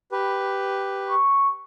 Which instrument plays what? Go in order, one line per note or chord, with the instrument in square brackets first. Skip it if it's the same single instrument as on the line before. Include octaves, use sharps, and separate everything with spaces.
[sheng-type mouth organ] G4 B4
[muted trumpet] C#6